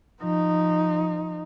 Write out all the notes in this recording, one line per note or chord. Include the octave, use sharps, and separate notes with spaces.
F3 D#4